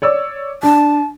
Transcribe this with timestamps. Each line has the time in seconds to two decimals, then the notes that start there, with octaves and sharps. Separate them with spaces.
0.02 C#5 D5 E6
0.63 D4 A5